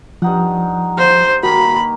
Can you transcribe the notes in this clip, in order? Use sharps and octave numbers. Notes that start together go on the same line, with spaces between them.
G2 F3 D#4 F#5
C5 F5
D#3 A#3 F#4 B5